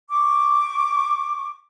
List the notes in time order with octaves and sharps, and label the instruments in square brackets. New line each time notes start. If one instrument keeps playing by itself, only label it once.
[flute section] C#6 D6